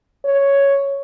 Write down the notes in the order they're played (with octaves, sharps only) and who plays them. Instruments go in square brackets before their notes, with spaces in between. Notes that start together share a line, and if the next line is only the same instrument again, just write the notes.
[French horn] C#5